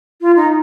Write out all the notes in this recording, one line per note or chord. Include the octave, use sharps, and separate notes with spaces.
F4
D#4